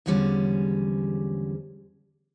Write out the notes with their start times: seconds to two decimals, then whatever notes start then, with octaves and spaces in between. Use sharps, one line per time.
0.06 E2 G#2 D3 F3 G3 C#4